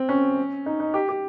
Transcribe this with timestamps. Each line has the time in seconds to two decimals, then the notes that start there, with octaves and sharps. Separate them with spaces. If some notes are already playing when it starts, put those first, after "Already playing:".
Already playing: C4
0.09 C#4
0.66 D#4
0.80 D#4
0.94 G4
1.09 G4